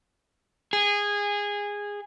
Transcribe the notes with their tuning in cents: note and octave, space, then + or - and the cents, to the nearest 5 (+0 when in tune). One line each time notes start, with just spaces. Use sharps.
G#4 -20